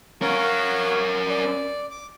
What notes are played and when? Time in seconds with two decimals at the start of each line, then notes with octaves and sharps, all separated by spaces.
0.22 C#4 A#4 C#5 F5 F#5
1.28 D5
1.91 D6